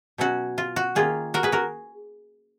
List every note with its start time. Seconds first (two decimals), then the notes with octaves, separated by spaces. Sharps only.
0.18 B2 F#3 C#4 F#4
0.58 F4
0.76 F#4
0.95 D#3 A#3 C#4 F4 G#4
1.34 F#4 A#4
1.43 G#4 B4
1.52 F#4 A#4